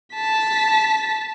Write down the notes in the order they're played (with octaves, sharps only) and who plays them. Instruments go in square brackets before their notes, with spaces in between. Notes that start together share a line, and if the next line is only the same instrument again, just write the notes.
[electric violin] A5 B6